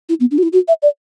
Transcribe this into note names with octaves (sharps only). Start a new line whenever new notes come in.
E4
B3
D4
F#4
E4
F#4
E5
D5